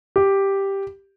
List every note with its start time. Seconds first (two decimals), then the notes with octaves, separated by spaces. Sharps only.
0.16 G4